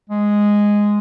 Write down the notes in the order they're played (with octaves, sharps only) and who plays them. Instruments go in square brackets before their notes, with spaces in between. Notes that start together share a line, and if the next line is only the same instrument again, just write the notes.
[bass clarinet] G#3